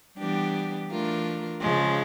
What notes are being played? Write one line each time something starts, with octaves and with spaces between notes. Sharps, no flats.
E3 G3 B3 D4 G4
E3 A3 D4 F4 A#4
C#3 F3 G#3